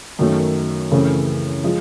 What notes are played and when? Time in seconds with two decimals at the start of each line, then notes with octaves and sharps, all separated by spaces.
0.19 F#2 D#3 F#3 A3
0.91 F#2 C#3 E3 A3 C4
1.64 F3 G#3